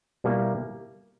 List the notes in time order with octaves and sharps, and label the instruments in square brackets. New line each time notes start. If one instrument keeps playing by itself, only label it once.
[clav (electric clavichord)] B2 G3 A#3 E4